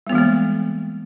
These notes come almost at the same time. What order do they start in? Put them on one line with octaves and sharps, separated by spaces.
G3 B3 E3 G#3 A#3